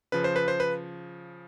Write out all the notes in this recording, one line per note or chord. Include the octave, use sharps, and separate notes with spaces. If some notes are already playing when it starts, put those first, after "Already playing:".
C#3 F3 B4
C5
B4
C5
B4